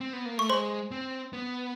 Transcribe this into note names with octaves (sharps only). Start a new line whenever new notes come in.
C4
B3
A#3
A3 C#6
G#3 C5 C6
C4
B3